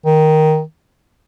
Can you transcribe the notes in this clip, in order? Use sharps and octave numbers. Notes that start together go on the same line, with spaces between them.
D#3